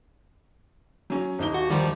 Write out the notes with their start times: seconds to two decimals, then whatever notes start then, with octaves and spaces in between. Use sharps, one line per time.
1.10 F#3 C#4
1.39 D#1 D#4 G7
1.54 F#4
1.70 D#3 F3 G3